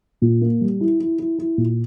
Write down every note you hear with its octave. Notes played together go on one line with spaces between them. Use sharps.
A#2
A#3
G3
E4
E4
E4
E4
A#2